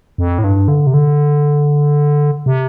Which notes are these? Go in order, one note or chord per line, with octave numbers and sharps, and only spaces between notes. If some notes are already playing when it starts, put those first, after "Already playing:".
F2
A2
G2
D3
C3
D3
C3